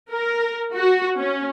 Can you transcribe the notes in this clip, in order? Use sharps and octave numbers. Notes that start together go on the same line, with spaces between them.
A#4
F#4
C#4